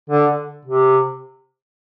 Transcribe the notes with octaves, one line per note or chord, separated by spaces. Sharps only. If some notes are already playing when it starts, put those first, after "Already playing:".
D3
C3